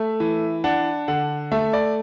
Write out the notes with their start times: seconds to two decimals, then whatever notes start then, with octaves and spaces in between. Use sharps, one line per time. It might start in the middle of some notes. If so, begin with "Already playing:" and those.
Already playing: A3 E5
0.20 E3
0.64 D4 F#5
1.08 D3 F#5
1.52 A3 E5
1.73 D5